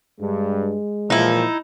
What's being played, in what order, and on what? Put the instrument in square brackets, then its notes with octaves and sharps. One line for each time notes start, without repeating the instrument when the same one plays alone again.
[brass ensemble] G2 [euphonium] G#3
[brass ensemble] A#2 E3 F3 [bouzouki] D#4 E4